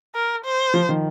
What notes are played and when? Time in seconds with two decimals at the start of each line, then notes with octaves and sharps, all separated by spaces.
0.15 A#4
0.45 C5
0.74 F3
0.89 D#3